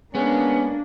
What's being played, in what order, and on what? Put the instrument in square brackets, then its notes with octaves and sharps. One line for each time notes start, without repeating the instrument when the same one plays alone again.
[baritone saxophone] G#3 [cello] A#3 D4 [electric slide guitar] B3 [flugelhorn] C#4